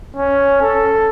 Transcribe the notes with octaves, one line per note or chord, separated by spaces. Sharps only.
C#4
A4